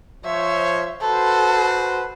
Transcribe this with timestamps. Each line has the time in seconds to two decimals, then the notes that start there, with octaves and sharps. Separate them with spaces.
0.25 F3 C5 C#5 E5
1.01 F#4 A4 B4 C5